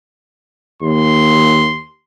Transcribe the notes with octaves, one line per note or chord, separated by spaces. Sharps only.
D#2 C6